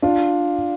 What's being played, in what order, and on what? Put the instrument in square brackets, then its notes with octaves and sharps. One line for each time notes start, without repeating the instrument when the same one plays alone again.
[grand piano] D4 F4